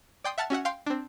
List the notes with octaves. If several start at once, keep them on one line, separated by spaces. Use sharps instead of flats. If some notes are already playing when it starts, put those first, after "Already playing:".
D5 G5 C6 D#6
E5 F#5 A5 F6 A6
C#4 F#4 E5 F#5
F5 G5 C6 C7
C4 D4